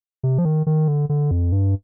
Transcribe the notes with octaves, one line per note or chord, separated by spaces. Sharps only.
C3
F3
D#3
D#3
D3
D3
F2
G2